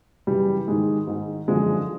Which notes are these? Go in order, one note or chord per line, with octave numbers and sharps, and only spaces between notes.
F#2 C#3 E3 G3
G#2 D#3 G#3
G#2 D#3
F#2 D3 F3 G#3